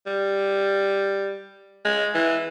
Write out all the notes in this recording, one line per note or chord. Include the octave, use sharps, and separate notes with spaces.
G3
G#3
E3